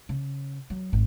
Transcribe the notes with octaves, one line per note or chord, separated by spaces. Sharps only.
C#3
F#3
G#1 F#2